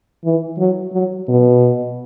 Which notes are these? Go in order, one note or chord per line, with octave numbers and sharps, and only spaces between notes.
E3
F#3
F#3
B2